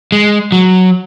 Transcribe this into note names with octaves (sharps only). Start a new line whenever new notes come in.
G#3
F#3